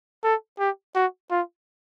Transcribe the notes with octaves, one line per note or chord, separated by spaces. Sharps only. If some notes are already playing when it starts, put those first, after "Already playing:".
A4
G4
F#4
F4